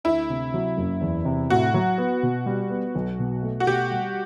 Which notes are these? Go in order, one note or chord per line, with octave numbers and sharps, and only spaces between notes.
D2 E4
C3
F#3
F#1
E2
C3
A2 F#4
F#3
B3
B2
G3
B3
B1
B2
A3
F#4
B2 G4
G3